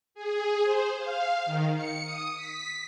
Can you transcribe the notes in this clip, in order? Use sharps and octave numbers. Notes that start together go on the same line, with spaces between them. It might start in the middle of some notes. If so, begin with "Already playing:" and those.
G#4
C5
F5
D#3
C#7
D#6
B6